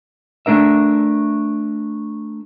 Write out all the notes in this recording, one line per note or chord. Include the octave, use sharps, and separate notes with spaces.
A3 D4 A#4 E5